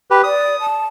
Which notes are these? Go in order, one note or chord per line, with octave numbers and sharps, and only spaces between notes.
G4 B4
D5 D#6
A5